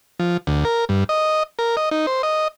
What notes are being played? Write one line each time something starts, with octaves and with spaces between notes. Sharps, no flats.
F3
D2
A#4
G2
D#5
A#4
D#5
D#4
C5
D#5